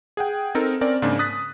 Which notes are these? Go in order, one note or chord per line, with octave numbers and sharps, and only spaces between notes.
G#4 F#5 G5
C4 D#4 A4 A#4
C4 C#4 A#4 D5
G#2 C#3 A#3 D4
D#6 F#6 A6 B6